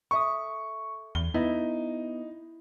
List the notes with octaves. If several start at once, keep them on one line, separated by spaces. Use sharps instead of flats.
A4 E5 C#6 D#6
E2 G7
B3 D#4 E4